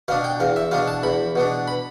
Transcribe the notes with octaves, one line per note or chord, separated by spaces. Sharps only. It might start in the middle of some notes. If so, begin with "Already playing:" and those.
B2 B3 D4 F5
G5
E2 F5
E5
B2 B3 D4 F5
A5
E2 B5
B2 B3 D4
B5